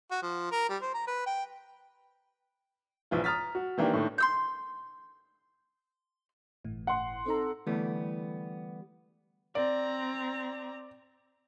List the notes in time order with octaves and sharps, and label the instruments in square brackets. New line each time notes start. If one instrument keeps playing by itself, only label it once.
[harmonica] F#4
F3
A#4
G3
C5
A#5
B4
G5
[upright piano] A#1 E3 F4
A#5 D#6 F6 A6 B6
F#4
D#3 E3 A#3 D4 G4
A2 D3 D#3
[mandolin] C6 E6 G6
[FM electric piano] G1 A2 E3
[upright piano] F#5 C6
[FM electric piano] C4 D#4 A#5 [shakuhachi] A4
[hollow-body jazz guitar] D3 E3 G3 A3 B3
[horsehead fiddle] C4 A#5 [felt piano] D5